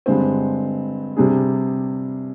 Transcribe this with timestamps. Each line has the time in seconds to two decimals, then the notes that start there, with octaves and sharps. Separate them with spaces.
0.06 G2 D3 G#3 C4
1.17 C3 G3 D4 G#4